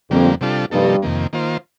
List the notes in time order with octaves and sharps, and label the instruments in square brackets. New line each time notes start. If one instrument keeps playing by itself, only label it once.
[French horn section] F2 [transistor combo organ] D3 G3 A#3
[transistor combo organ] C3 G3 D4 F4 A4
[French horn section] G2 [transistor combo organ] C3 F3 A#3 D#4 A4
[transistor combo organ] F2 C3 D#3 A#3
D#3 A#3 F4 C5